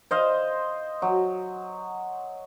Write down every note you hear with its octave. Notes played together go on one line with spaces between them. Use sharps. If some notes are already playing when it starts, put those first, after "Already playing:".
C5 D#5 F5
F#3